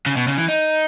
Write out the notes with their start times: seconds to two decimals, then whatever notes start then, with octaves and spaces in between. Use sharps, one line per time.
0.06 C#3
0.17 B2
0.28 C#3
0.37 E3
0.48 D#4